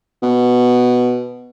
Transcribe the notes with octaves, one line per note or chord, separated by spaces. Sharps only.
B2